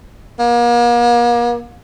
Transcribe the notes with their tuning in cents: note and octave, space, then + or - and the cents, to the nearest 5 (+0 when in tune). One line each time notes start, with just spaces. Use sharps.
A#3 +40